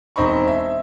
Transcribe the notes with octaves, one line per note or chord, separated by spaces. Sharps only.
E1 C4 D#4 C5 B5 C#6
E5